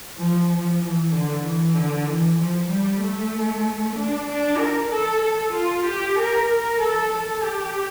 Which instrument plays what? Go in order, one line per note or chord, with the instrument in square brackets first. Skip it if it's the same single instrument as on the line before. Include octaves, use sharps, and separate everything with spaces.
[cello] F3
F3
E3
D3
E3
D3
E3
F3
G3
A3
D4
D4
A#4
A4
A4
F4
G4
A#4
A#4
A4
A4
G4